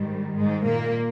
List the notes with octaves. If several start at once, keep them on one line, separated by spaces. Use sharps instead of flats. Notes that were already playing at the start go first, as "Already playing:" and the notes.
Already playing: G#2 D#3 G3
G#2 G#3
A#2 A#3